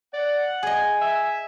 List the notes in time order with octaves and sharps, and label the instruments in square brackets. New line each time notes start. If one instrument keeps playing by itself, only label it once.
[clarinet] D5 [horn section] F#5
[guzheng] G#4 D#5 [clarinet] G#5
[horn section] E5